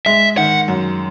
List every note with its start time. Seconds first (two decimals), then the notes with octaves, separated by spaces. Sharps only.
0.06 G#3 E5
0.37 D#3 F#5
0.68 F#2